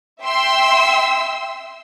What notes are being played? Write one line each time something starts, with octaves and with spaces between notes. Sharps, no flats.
E5 G5 C6 E6